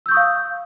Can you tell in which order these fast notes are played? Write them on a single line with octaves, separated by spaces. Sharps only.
E6 G6 C#6 D#6 F5